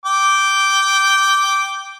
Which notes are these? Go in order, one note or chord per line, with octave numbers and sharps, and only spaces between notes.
G5 D6